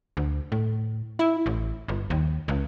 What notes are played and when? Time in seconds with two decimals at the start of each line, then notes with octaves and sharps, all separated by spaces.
0.17 D2
0.52 A2
1.19 E4
1.46 A1
1.88 G1
2.10 D#2
2.48 C#2